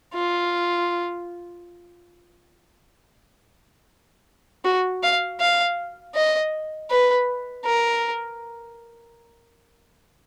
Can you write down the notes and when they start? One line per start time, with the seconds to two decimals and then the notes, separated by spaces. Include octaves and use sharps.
0.14 F4
4.65 F#4
5.03 F5
5.40 F5
6.15 D#5
6.90 B4
7.65 A#4